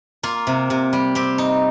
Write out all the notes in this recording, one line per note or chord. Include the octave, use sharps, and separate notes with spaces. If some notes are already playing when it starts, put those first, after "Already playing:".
A#3 F4
C3
C3
G3
C4 G4
D#4